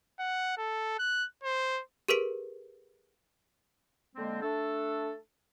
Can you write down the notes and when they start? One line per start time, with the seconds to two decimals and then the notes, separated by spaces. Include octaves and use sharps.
0.19 F#5
0.58 A4
0.99 F#6
1.43 C5
2.08 G4 G#4 A#4 B4 B6 D7
4.16 D3 G#3 A#3 C4
4.42 A3 D4 A4